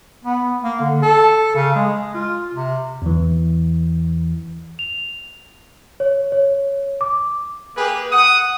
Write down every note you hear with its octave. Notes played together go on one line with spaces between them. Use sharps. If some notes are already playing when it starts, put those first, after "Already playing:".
B3
A#3
D3
A4
C#3
G#3
F4
C3
E2 E3
F7
C#5
C#5
D6
A#3 G4 G#4 B4
F#5 D#6